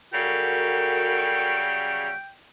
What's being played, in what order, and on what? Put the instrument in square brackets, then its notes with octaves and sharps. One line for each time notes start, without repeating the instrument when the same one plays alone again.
[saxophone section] C#3 F#3 G3 [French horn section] F#4 A4 A#4 [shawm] G5